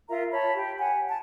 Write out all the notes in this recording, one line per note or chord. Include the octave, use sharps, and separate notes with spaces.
F4 A#4 E5 A#5
C#5 A5 B5
G4
F#5 G#5
A5